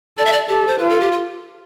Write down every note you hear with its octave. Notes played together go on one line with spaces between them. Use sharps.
A4 D5
E5
D5
G4 A4
C5
F4 B4
A4
G4
F4